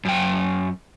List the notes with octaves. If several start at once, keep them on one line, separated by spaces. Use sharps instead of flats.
F#2 G5